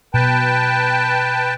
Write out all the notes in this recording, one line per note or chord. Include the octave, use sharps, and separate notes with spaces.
B2 B4 G5 A5